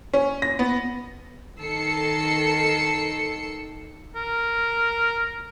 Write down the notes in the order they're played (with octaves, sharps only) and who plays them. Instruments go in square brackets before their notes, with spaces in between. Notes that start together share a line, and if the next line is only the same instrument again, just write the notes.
[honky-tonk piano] C#4
A#6
B3
[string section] D#3 A4 E6 C7 C#7
[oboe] A#4